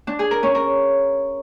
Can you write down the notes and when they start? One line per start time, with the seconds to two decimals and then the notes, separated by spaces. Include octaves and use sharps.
0.07 D4
0.19 G#4
0.31 A#4
0.43 C#4
0.55 A#4